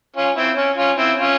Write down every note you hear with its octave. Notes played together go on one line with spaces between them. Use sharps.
C#4 F4
C4 E4
C#4
C#4 F4
C4 E4
C#4 F4